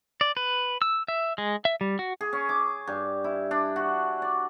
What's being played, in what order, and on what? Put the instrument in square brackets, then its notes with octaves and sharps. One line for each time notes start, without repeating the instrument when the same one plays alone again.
[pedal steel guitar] D5
B4
E6
E5
G#3
E5
G3
F#4
[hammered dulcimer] G#4
C#4
D6
G2
E4
D4
F#4
D5